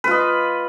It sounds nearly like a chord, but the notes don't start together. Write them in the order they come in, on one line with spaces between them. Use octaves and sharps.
B4 F4 D#5